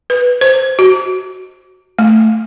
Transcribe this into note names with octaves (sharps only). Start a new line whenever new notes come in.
B4
C5
F#4
A3